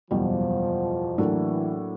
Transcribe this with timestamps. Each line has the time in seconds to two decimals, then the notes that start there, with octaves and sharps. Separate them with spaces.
0.11 F#1 E2 B2 F3 G3
1.18 A2 E3 F#3 A#3 D4